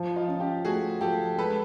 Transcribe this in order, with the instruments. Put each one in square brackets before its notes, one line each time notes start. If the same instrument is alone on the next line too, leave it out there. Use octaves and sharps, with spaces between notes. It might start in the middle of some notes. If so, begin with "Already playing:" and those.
Already playing: [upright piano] F3
[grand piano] D#4 F4
[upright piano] C#4
[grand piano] F4 G4
[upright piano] A3 [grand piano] F#4 G#4
[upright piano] F3 [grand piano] G4 A4
[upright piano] G#3 [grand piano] A4 B4